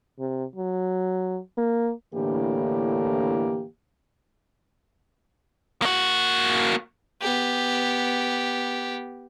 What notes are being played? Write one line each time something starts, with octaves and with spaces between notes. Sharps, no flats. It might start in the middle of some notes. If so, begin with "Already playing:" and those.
C3
F#3
A#3
A2 D3 E3 A#3 D4 G4
A#3 F#4
B3 G4